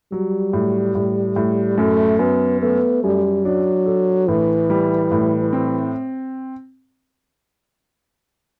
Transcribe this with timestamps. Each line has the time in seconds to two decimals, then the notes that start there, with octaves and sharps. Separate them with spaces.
0.12 F#3 G3
0.53 A2
0.95 A2
1.36 A2
1.78 F#2 A3
2.19 F#2 B3
2.62 A3 B3
3.03 F#2 G3
3.45 F#3 D4
3.86 A4
4.28 A2 E3
4.70 G3
5.12 A2
5.53 C4